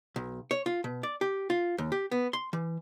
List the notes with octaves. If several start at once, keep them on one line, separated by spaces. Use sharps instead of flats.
B1
C#5
F4
B2
D5
G4
F4
D#2
G4
B3
C6
E3